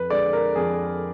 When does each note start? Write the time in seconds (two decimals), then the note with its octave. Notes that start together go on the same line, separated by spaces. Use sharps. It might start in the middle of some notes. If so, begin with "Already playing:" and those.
Already playing: F2 B4
0.10 D3 G#3 D5
0.33 A#4
0.55 F2 G#4